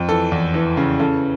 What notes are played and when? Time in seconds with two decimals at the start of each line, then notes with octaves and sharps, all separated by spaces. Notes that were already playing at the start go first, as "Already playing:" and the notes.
Already playing: F2
0.09 E3 A4
0.32 E2
0.54 E3
0.77 C#3
0.99 C#3 A4